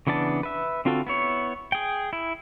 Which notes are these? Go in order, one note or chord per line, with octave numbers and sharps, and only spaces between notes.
C#3 E3 B3 D4 A5
B4 E5
D3 C4 F4 F#4 A4
B3 E4 C#5
G#4 G5
E4